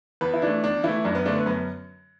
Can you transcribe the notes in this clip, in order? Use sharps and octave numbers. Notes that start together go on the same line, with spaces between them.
E2 B3 B4
E4
E3 A3 D4
E2 D4
E3 A3 E4
F#2 D4
B3
D3 A3 D4
B3
F#2 B3